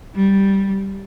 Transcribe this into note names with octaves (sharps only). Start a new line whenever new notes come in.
G3